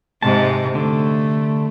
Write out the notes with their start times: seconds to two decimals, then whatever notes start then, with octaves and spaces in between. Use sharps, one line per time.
0.23 G#2 C3 G#3 A5
0.75 D3 A3